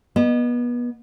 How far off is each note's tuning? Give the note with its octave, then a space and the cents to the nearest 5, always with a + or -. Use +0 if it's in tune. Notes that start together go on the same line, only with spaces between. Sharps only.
B3 -30 D#5 -25